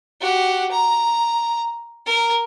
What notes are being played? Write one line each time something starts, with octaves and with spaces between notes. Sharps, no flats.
F#4 G4
A#5
A#4